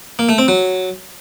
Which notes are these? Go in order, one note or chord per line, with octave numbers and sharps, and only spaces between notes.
A#3
A3
C4
F#3